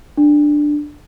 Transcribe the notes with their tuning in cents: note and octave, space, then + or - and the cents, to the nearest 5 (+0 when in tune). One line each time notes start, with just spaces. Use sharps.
D4 +10